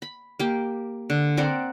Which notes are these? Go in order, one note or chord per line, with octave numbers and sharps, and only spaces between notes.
B5
A#3 G4
D3
C4 A#4 D5 F#5